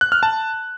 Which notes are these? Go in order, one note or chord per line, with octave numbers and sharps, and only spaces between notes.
F#6
F6
A5